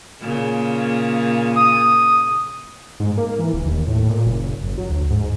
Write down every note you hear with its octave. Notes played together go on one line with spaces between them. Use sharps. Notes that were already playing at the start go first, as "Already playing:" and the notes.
A#2 C#3
D#6
G#2
A#3
E3
D1
D#2
A2
A#2
F#1
F#1
F#3
D2
G#2